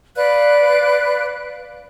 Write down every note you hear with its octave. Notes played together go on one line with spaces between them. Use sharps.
B4 D5 F5 F#6